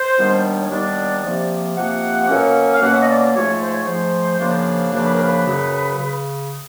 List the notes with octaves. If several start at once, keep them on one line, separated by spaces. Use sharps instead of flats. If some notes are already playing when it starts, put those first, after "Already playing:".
Already playing: C5
D#2 D#3 G3 B3 D4
C#5
D#2 D#3 G3 B3 D4 D5
C3 F3 A#3
C3 F3 A#3 F#5
B2 F#3 A#3 C#4
F5
B2 F#3 A#3 C#4 F#5
E5
D#5
D5
G#2 F3 A3 C#5
C5
C#5
G#2 F3 A3 C5
F#2 C#3 F3 A#3 D4
F#2 C#3 F3 A#3 D4 C5
B4
A#4
B4
F#2 C#3 F#3
C#3